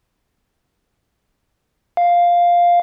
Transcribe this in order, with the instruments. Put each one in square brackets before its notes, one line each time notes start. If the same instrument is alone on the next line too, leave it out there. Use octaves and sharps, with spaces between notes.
[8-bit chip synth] F5